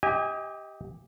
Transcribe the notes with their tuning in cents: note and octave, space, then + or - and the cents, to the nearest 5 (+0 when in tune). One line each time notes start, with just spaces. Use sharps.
G4 +0 D#5 +30 G#5 -35